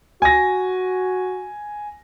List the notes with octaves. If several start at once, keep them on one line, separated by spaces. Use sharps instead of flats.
F#4 G#5 A#6